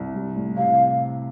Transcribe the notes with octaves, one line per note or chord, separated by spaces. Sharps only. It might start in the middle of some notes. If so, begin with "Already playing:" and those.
Already playing: C2
G3
A2
C3 F5